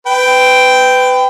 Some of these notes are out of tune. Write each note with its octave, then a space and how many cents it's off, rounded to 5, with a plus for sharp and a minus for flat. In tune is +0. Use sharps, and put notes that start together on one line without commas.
B4 +30 G5 +0